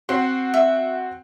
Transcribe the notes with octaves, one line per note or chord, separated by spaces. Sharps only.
C4 F#4 C6
E5